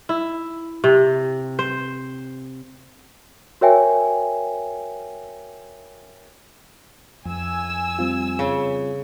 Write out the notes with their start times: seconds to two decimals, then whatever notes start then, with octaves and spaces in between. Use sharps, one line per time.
0.09 E4
0.84 C3
1.59 C5
3.61 F#4 A#4 C#5 E5 G5 G#5
7.25 F2 G#5 E6
7.99 G3 C4 F4
8.39 C#3